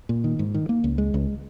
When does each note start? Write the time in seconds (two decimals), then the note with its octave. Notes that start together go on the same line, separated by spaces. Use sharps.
0.09 A#2
0.24 D#3
0.39 G#2
0.54 D#3
0.69 A#3
0.84 C#2
0.98 G#3
1.14 C#2